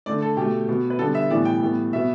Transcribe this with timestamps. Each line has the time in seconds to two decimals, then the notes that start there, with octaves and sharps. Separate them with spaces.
0.06 D3 A3 D5
0.22 A4
0.37 B2 A3 G4
0.68 B2 B3
0.90 B4
0.99 D3 G3 B3 A4
1.15 E5
1.30 A2 E3 G3 B3 D5
1.45 G5
1.61 A2 G3 B3
1.93 B2 B3 E5